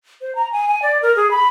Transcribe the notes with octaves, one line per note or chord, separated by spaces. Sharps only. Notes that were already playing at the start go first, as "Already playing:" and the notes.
C5
A#5
G#5
G#5
D5
A#4
G#4
B5